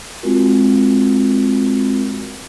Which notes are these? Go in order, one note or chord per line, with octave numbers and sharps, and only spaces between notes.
G#3 C4 F4 F#4 A#4